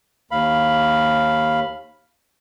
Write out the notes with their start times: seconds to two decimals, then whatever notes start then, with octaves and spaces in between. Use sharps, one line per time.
0.31 D#2 F5 B5